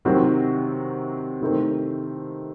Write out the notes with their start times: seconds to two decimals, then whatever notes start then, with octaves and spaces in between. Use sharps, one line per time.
0.05 C3 D#3 F#3 C4 F#4
1.41 C3 D#3 A3 C4